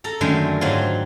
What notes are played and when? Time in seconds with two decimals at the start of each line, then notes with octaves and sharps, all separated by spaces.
0.04 A4 A#5
0.21 F#2 D3 D#3 G#3 A3
0.61 G#2 F#3 C4 F4